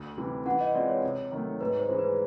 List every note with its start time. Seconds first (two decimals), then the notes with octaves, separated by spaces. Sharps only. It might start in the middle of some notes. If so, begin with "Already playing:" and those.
Already playing: D2
0.17 C3 E3 G3
0.46 E3 F#5
0.60 D#5
0.74 G#3 C4 F4 G#4 D5
0.89 C#5
1.04 C3
1.32 D#3 F#3 A3
1.61 G#2 B4
1.80 C5
1.90 E3 G#3
1.99 B4